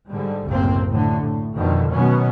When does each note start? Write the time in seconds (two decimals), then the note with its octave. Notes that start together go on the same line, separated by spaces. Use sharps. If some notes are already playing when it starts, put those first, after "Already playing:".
0.11 G#2 D3 G3
0.46 F#1 C2 A2 C3 A#3 C4
0.90 A2 D3
1.22 A2
1.55 F2 B2 D3 D#3
1.91 B2 D#3 F#3 B3 C#4